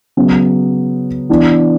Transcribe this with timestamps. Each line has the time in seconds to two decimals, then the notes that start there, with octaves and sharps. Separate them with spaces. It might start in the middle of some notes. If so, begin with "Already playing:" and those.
0.17 C#3 F#3 B3
1.29 E3 B3 D4